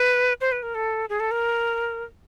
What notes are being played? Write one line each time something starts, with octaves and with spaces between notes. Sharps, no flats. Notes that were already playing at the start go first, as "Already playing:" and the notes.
Already playing: B4
C5
B4
A#4
A4
G#4
A4
A#4